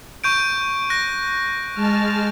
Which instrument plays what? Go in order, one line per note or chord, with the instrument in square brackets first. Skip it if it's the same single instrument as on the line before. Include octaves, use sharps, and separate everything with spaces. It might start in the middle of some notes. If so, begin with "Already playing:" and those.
[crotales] C#6 G6 D7
F#6 A#6
[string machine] G#3 A5 F6